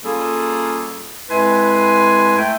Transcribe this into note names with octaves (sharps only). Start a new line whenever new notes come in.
G3 A#3 C#4 F4 G#4 A4
F2 G#3 E4 B4 G#5 C6
A3 G5